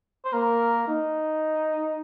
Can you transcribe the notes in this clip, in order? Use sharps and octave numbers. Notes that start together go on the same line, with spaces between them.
C5
A#3 A#4
D#4